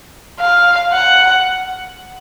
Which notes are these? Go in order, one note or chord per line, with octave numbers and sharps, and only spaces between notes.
F5
F#5